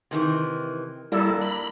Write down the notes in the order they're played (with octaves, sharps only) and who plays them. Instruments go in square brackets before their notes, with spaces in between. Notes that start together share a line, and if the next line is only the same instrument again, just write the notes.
[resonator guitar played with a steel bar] C3 D#3 E3
[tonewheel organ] G3 E4 A4 [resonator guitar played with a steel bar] A#3 D4
[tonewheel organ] B5